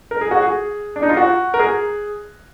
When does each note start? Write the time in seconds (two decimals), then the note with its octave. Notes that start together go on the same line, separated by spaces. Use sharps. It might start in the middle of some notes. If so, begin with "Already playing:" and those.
0.11 A#4
0.21 G#4
0.31 F#4
0.42 G#4
0.96 D4
1.02 D#4
1.09 F4
1.17 F#4
1.54 A#4
1.59 G#4